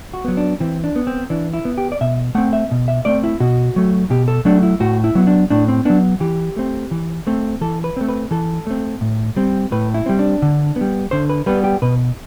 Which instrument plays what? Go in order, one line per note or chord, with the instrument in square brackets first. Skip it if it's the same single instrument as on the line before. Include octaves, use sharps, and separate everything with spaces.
[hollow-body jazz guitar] F#4
F#3 B3
D4
E3 C4
D4
B3
C4
E3 D4
E4
B3
G4
D5
B2 E5
A3 C4 F#5
E5
B2
E5
A3 C4 D5
E4
B2 F#4
F#3 A3
B2 G4
A4
F#3 A3 D4
E4
A2 F#4
E4
F#3 B3
D4
A2 D4
C4
F#3 B3 D4
E3 G4
A3 C4
E3
A3 C4
E3 A4
B4
A3 C4
B4
E3 A4
A3 C4
A2
G3 C4
A2 B4
E4
G3 C4
D4
D3
G3 B3
D3 C5
B4
G3 B3 B4
G4
B2 B4